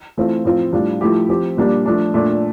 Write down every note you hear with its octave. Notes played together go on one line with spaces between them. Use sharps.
E3 A3 C4 F4
A2 F3 C4 F4
A2 G3 D4 F4
F3 A3 E4 G4
F3 C4 G4
A#2 G3 A#3 D4 G4
F3 A3 D4
A#2 A3 D4